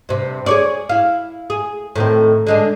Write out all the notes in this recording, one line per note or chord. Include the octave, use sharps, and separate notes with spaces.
G2 C3
G#4 C#5 D5
E4 F5
G#4
A2 D#3 C4
D3 G#3 D4